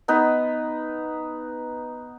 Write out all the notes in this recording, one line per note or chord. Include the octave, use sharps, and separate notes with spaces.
B3 D#4 B4